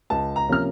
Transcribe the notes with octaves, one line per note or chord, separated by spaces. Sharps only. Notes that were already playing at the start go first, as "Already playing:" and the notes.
C#2 A5
A#5
C3 F3 A#3 C#4 F6